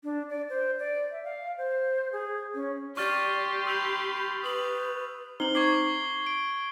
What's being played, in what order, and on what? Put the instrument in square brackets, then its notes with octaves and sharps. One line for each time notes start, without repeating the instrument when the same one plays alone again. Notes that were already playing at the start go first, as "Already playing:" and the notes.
[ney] D4
D5
C5
D5
E5
F5
C5
G#4
C#4
[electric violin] G4 C6 [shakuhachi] D5 [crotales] C#6 F6 A6
[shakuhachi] B5 [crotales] E6 G6 F7
[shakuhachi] B4 [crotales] D#6 F#7
[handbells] C4 D#4 C5 [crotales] F#7 G7
[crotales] C#6 G#6 C7 [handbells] D6
[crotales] D7